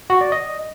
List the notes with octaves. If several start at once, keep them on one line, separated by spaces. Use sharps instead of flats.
F#4
D5
D#5